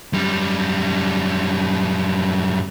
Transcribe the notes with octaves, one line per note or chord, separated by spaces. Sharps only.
F#2 G3